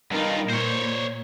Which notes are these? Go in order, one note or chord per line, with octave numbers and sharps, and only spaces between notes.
G2 D#4 F4 A#4
A#2 C5 C#5